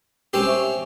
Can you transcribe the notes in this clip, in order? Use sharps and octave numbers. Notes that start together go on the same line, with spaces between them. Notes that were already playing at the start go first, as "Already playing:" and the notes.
C4 C#4 G4
C5 E5 C#6